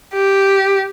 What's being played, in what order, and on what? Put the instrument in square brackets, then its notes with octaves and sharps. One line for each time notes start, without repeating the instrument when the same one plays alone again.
[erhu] G4